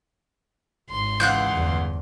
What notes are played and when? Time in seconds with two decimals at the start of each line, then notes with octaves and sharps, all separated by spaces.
0.90 G#1 C6
1.20 C#2 E3 F5 F#5 F#6 G6
1.53 G1 E2